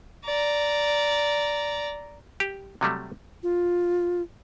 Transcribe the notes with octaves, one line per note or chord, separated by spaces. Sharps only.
D5 A#5
G4
C3 F#3 G3 A3
F4